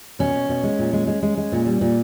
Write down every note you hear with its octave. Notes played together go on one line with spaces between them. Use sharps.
B2 C#4
B2
B2
G#3
A#2
G#3
G#3
G#3
G#3
A#2
G3
A#2